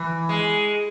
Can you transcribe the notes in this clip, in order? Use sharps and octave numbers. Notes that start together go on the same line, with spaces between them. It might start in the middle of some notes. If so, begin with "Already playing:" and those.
Already playing: E3
G#3